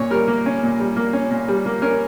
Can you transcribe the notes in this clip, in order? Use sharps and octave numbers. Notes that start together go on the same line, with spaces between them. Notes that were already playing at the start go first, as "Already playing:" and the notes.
Already playing: A#2 C#4 C#5
G3 A#4
A#3
C#4
A#2
G3
A#3
C#4
A#2
G3
A#3
C#4 A#4